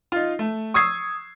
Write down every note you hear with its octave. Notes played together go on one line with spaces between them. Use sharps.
D#4 F4
A3
C#6 D#6 E6 G#6 C7